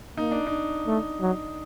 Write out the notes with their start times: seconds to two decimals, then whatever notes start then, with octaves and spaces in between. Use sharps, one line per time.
0.17 A#3 D#4
0.32 D4
0.47 D#4
0.87 A3
1.21 F#3